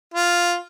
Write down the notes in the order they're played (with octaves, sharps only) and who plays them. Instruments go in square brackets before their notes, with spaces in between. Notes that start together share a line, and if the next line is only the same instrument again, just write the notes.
[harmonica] F4